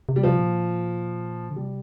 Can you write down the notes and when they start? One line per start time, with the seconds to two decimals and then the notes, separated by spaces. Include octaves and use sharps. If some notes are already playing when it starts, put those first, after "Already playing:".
0.09 C3
0.16 G3
0.23 C3 F3
0.38 A#2
1.50 D3
1.56 C3 G3